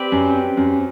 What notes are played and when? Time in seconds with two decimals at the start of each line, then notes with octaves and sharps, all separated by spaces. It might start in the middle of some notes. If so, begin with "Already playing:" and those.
Already playing: C4 G4 B4 D5
0.12 F#2
0.57 F#2